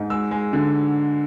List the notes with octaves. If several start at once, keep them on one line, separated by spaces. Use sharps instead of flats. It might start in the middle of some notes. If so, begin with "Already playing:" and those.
Already playing: G#2
G#3 E6
G#3
D3